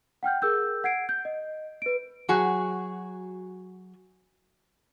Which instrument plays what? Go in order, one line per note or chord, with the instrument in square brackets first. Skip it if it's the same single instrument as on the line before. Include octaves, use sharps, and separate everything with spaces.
[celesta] F#5 G5 F6 G6
G#4 A#4 E6 G6
F#5 G#6 C7 D7
G6
D#5
B4 D7
[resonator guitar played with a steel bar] F#3 F#4 G#4